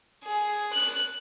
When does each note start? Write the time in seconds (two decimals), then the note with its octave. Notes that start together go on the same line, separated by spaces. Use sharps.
0.24 G#4
0.73 F#6